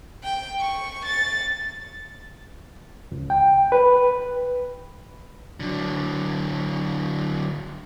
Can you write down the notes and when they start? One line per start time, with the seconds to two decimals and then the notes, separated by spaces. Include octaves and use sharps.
0.23 G5
0.59 C#6
1.05 A6
3.12 C#2
3.30 G5
3.72 B4
5.60 D3 F#3